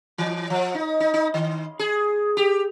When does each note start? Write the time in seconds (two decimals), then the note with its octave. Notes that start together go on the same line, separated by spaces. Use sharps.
0.18 E3
0.50 F3
0.74 D#4
1.00 D#4
1.14 D#4
1.34 D#3
1.79 G#4
2.37 G4